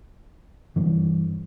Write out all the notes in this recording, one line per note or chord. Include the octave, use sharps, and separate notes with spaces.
G2 E3